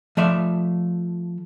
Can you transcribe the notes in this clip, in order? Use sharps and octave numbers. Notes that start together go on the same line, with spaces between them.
F3 A3 D5 E5